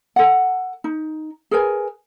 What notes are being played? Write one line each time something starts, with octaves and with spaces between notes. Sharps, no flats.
A4 F#5
D#4
G#4 A#4 B4 G#5